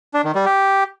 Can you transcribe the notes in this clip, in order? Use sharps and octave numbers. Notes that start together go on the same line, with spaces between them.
D4
D#3
G3
G4